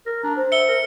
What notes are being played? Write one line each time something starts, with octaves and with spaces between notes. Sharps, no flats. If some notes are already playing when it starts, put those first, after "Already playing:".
A#4
D4 A#5
C5
E5 C#7 G7
A#4